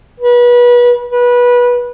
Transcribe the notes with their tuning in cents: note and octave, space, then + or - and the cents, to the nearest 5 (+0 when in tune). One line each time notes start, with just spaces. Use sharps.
B4 -30
B4 -20